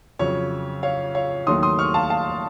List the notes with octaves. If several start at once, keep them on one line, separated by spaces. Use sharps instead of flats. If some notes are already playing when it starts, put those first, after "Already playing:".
F2 C#3 F#3 C#5
C#5 F5
C#5 F5
D#2 D#3 F#3 A3 C6 D#6
C6 D#6
C#6 F6
F5 A5
F5 A5